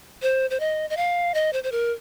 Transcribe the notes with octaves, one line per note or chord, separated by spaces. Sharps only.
C5
C5
D#5
D#5
F5
D#5
C5
C5
A#4